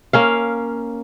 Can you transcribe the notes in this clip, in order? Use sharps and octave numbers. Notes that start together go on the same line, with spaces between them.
A#3 C#4 F5